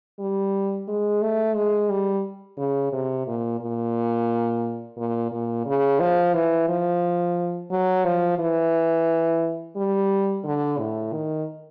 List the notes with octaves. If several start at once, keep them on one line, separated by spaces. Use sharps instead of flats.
G3
G#3
A3
G#3
G3
C#3
C3
A#2
A#2
A#2
A#2
C#3
F3
E3
F3
F#3
F3
E3
G3
D3
A2
D#3